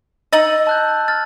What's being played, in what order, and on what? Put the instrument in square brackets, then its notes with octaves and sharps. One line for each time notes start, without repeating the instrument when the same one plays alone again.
[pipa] D#4 D#5 [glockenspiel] E6 A6 F#7
[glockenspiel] A5 F#6 G6
F6 A6